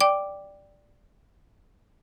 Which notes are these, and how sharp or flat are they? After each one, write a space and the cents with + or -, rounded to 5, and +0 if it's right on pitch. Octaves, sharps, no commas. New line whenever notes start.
D5 +0 G5 +0 D6 +0